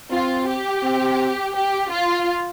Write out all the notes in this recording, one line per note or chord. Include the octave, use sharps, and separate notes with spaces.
C4 F4
G4
C4
G4
F4